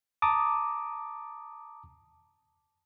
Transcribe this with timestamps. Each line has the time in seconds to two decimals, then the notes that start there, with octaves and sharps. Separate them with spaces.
0.22 A5 A#5 D6 D#6